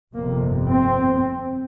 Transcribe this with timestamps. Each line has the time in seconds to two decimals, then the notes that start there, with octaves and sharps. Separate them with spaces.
0.14 G1 F2 C3 A#3
0.70 C4